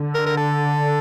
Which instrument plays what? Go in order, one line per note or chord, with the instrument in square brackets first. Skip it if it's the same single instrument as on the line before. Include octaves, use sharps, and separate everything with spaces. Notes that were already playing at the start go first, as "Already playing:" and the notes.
Already playing: [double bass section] D3
[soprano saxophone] A#4
A#4
A4